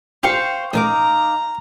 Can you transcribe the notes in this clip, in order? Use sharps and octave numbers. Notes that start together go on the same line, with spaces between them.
D4 F4 G4 C5 F5 G5 C#6
A1 A2 D#4 A#4 F5 A#5 D6